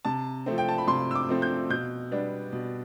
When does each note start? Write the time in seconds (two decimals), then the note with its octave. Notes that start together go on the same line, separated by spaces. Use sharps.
0.05 C3 A5
0.46 F3 A3 C4
0.58 G5
0.69 A5
0.78 B5
0.87 C3 C6
1.11 E6
1.15 D6
1.29 F3 A3 C4
1.42 G6
1.70 B2 G6
2.11 G3 B3 D4
2.52 B2